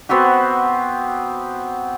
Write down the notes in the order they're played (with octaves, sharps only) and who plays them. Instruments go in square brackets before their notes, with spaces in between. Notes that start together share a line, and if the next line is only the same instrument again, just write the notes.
[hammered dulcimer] B3 C4 F#4 G4